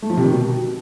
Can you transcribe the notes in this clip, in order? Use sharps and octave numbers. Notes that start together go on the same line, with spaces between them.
A3
F3
C3
D#3
B2